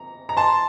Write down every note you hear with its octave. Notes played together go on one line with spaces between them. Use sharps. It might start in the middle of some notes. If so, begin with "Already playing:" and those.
Already playing: A#5
A#5
A5 C6